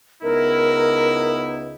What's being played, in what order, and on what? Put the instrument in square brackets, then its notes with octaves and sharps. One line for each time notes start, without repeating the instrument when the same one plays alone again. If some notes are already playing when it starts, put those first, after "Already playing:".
[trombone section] C#2 B3 D#4 [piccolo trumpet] E4 [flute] A#4